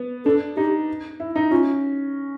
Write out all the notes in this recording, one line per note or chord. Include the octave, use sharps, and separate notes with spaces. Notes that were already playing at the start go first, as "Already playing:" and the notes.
Already playing: B3
D4 A4
D#4 G4
E4
D#4
C#4 F4